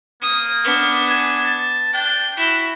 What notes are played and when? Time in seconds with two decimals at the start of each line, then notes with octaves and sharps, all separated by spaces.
0.22 A#3 D#6
0.64 B3 D4
1.09 G#5
1.45 A5
1.93 D4 G5
2.37 E4 F#4